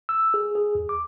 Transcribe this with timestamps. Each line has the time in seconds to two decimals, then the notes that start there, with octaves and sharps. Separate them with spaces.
0.09 E6
0.34 G#4
0.55 G#4
0.75 E2
0.89 D6